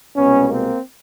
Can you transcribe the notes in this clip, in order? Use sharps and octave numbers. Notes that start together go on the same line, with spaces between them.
C2 B2 G#3 B3 C#4
A#3 C4